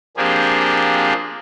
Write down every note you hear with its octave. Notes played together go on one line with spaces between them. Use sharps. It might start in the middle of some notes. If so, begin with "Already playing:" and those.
F3 A#3 C4 D4 G4 G#4